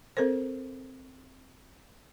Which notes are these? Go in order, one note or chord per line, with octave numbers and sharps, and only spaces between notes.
C4 A4 A#4 C5